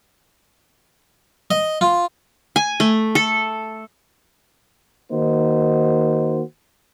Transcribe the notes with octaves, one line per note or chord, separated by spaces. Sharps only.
D#5
F4
G#5
A3
A4
D#3 A#3 D#4 F#4 C5